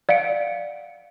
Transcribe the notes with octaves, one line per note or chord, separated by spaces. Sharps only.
D5 F5 F#5 C#7 D7